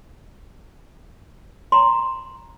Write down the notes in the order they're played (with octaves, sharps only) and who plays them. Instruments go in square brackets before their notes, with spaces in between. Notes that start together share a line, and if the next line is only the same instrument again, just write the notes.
[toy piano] A#5 C6